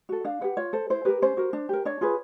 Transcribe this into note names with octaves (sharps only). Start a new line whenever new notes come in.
F#4 A4
D4 F5
G4 B4 F#5
F4 C#5
A4 C5
E4 C5
G4 A#4 B4
C#4 C5
F#4 A#4
D4
G4 A#4
D4 C#5
F4 G#4 B4